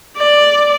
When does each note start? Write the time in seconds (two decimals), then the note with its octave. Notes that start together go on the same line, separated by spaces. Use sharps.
0.17 D5